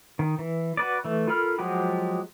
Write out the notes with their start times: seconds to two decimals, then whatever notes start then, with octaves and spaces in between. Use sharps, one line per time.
0.19 D#3
0.39 E3
0.77 F#4 B4 D5
1.05 E3 A3
1.28 F4 A4 A#4 B5 F6
1.59 F3 F#3 G#3 F#4 G4